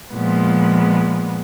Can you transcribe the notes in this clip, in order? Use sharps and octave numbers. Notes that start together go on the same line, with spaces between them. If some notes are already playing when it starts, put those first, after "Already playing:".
A#2 F3 G#3 B3